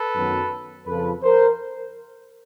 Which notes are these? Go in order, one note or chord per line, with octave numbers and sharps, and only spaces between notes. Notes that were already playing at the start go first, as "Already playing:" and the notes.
Already playing: A4 B4
F#2 D#3 F#3 B3
F2 C#3 F3 A4 B4
A#4 C5